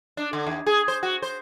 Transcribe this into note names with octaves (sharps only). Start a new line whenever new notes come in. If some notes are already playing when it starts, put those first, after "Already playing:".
D4
D3
D#2
G#4
C5
F#4
C5